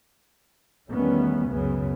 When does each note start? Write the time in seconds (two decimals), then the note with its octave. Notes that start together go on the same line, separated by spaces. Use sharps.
0.90 E2 D#3 G3 A3 B3 C#4
1.48 C#2 F#2 C#3 B3